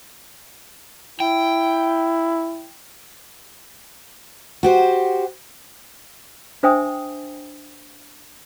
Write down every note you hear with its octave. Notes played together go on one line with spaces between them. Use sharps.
E4 G5
F#4 G4 C5
D4 C5 E5 G5 G#5 D#6